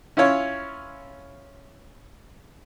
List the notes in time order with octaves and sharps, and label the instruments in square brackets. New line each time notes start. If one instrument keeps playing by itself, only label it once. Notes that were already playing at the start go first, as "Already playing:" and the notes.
[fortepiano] C#4 E4 F4 C#5